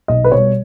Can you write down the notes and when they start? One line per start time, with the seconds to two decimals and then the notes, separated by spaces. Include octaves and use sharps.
0.08 B1 D#5
0.24 B4
0.32 B2 G3 C#5